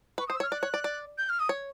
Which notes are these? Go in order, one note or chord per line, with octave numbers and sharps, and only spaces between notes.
B4 C#6
D#6
C5
E6
C#5
F6
D5 F#6
C#5
D5
D5
G6
F6
D#6
C#5